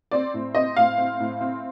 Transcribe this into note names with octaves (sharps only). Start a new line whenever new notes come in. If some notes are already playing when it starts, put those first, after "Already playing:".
C4 D5
A2
C4 D#5
A2 F5
C4
A2
C4